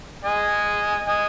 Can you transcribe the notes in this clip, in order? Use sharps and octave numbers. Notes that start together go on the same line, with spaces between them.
D#5 G#5
D#5 G#5